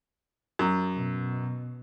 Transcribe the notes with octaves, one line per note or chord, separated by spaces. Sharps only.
F#2
B2